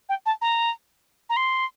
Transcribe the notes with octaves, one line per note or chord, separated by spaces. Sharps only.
G5
A5
A#5
A#5
C6